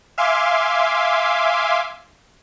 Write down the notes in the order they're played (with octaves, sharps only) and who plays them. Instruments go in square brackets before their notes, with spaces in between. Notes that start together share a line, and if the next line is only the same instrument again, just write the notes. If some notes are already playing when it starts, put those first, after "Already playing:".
[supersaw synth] E5 F5 G#5 C6 D6